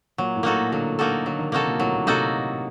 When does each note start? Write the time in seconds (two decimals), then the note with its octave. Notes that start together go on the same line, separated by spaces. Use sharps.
0.18 A#2 F#3
0.36 A2
0.43 A#3 D#4 F#4 A4
0.54 A#2
0.72 D3 F#3
0.99 A#3 D#4 F#4 A4
1.26 D3 F#3
1.39 D#3
1.52 C3 A#3 D#4 F#4 A4
1.66 A#2
1.80 A2 F#3
1.93 A#2
2.06 C3 A#3 D#4 F#4 A4